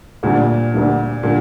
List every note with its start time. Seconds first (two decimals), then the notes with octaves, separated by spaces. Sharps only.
0.23 D2 A#2 D3 G3 D4
0.73 D2 D3 G3 D4
1.23 A#2 D3 G3 D4